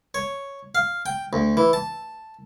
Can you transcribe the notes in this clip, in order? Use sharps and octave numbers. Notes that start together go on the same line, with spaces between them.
C#5
F5
G5
D2
E3
A5